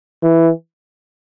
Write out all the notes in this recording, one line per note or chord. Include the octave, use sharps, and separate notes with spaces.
E3